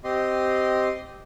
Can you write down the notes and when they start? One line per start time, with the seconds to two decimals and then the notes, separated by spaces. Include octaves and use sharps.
0.04 C4 G4 D#5 C6